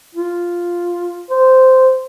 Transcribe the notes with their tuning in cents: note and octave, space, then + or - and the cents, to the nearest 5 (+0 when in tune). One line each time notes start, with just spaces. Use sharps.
F4 +0
C5 -10